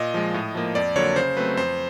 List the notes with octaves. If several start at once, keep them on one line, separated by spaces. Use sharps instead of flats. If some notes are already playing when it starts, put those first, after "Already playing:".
Already playing: A#2 D#5
F3 G#3
A2
F3 A#3
F2 D5
D3 F#3 A#3 C#5
C#3 C5
F#3 A3 C4 B4
F2 C5